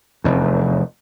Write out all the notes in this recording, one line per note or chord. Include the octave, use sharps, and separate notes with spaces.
F1 E2